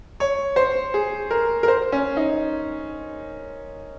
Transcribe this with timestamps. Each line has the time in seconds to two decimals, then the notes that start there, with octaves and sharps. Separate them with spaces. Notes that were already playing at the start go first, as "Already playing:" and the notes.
0.20 C#5
0.56 C5
0.94 G#4
1.31 A#4
1.63 A#4
1.68 C5
1.92 C#4
2.17 D#4